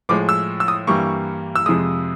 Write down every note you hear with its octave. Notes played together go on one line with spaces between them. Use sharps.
A2 F3 G#3 D6
E6
E6
D#6
G2 E3 G3 A#3 C#6
E6
F2 C3 F3 G#3 D#6